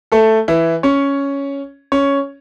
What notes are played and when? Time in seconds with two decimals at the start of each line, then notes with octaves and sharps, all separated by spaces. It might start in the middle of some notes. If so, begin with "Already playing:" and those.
0.12 A3 A4
0.48 E3 E4
0.83 C#4 C#5
1.92 C#4 C#5